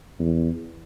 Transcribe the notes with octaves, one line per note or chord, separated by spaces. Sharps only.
E2